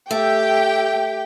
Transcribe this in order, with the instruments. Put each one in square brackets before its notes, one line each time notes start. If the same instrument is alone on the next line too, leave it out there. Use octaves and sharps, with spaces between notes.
[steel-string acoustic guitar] A3 [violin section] G4 G5